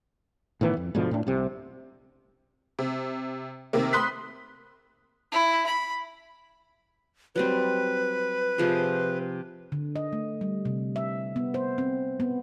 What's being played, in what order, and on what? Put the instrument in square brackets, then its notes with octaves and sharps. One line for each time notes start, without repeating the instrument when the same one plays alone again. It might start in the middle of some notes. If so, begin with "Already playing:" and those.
[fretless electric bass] A2 D#3 E3 B3
F2
G#2 B2 D3 F3
A2 D4
C2 C3
[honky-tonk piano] C3
C3 D#3 A#3
B5 C6 D#6 F#6 B6
[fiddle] E4
B5
[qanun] F#3 G3 C4 [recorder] B4
[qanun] C3 F3 G#4
[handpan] D3
D#5
A3
G3
C3
E5
B3
C5
C4
B3